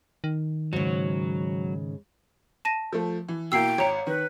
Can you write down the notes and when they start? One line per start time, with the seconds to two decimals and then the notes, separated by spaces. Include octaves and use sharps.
0.24 D#3
0.73 G#2 C#3 F#3
2.65 A5 A#6 D#7
2.93 F3 A3
3.29 E3
3.52 B2 A#3 E4 G5 E6 C7
3.78 G#1 C#5 A#5 C#7
4.07 D#3 B4